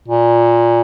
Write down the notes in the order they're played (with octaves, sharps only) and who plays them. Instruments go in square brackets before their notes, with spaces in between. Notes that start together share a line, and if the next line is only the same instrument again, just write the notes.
[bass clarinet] A#2